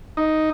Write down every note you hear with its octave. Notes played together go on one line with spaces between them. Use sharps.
D#4